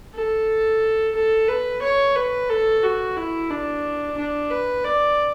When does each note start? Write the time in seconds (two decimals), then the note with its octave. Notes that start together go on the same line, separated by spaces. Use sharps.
0.14 A4
1.15 A4
1.48 B4
1.82 C#5
2.16 B4
2.49 A4
2.83 F#4
3.16 E4
3.50 D4
4.17 D4
4.50 B4
4.84 D5